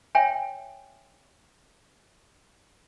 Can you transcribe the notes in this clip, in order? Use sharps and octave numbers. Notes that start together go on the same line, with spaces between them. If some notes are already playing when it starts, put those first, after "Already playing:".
C#5 E5 G5 G#5